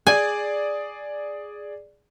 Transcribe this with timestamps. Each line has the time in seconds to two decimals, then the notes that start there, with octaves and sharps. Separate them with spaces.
0.07 G#4 D5 G#5